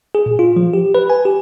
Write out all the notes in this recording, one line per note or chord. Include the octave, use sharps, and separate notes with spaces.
G#4
A#2
F4
F3
G4
B4
G#5
G4